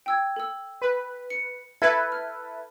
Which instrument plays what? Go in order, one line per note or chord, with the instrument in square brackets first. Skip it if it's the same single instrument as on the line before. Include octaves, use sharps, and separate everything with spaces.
[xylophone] G5 E6 G#6
A4 E6
[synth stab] B4
[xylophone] C#7
[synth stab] E4 A4 B4 [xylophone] G#6
[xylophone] F6